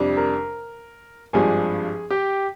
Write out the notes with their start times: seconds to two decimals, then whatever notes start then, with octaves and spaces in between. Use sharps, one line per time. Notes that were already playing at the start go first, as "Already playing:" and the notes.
Already playing: F2 C3 G3 D4
0.17 A#4 A#5
1.33 G#1 G2 F3 G#3 D4 G#4 G#5
2.10 G4 G5